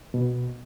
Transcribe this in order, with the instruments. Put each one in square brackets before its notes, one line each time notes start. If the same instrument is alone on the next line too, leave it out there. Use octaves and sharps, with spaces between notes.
[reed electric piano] B2